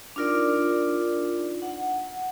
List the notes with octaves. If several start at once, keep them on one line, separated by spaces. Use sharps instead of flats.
D4 D#4 F4 A#4 D5
F#5